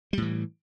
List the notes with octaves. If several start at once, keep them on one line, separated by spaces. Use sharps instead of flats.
A2 E3 G3